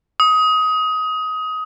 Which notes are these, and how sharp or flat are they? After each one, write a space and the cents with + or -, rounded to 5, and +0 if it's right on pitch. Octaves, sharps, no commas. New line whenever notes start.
D#6 +20